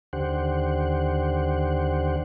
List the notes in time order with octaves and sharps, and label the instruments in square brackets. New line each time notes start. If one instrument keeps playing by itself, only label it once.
[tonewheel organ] D#2 D3 G4 C5 F#5